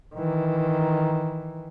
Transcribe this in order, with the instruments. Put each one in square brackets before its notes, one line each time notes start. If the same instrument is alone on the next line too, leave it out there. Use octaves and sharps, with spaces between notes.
[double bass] D#3 E3